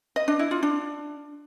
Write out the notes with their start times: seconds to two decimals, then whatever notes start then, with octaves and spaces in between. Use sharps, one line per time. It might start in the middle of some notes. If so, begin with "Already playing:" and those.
0.16 D#5
0.28 D4
0.39 E4
0.51 F4
0.63 D4